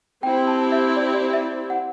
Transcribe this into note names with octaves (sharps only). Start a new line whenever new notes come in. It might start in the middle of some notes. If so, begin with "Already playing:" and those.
C4 E4 G4 G5
A5
E5
D5
D5
E5
F#5